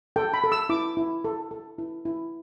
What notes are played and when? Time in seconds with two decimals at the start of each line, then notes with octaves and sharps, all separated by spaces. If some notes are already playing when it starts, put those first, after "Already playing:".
0.16 A4 G5
0.34 B5
0.44 A4
0.52 E6
0.69 E4 D6
0.97 E4
1.25 A4
1.51 A4
1.78 E4
2.05 E4